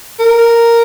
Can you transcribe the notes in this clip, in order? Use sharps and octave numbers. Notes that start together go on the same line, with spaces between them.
A#4